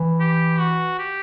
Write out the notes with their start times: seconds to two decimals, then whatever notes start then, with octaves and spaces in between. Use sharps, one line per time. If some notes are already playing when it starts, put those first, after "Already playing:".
Already playing: E3
0.20 G4
0.59 F#4
0.99 G4